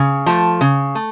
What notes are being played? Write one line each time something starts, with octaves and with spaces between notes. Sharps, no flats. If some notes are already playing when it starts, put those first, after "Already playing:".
Already playing: C#3
F3 A3
C#3
A3